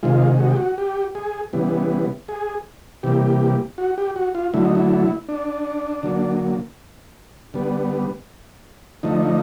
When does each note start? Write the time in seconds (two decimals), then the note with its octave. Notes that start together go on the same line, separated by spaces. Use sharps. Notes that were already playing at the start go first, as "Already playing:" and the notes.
0.03 C3 D#3 G#3 F4
0.40 F#4
0.49 G4
0.56 F#4
0.78 G4
1.15 G#4
1.53 C#3 E3 G3 B3
2.29 G#4
3.03 C3 E3 G3 A#3 G4
3.78 F#4
3.98 G4
4.16 F#4
4.35 F4
4.54 D3 F#3 A3 E4
4.65 D#4
4.75 E4
5.29 D4
6.03 D3 F#3 A#3
7.54 D3 G3 B3
9.03 D3 F3 A3 D#4